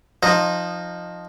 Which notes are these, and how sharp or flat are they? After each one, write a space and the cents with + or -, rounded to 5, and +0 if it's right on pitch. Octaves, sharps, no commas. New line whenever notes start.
F3 +10 D#4 -15